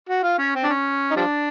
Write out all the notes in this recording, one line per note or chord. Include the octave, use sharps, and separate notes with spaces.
F#4
F4
C#4
C4
D4
C#4
D#4
F3 G3 D4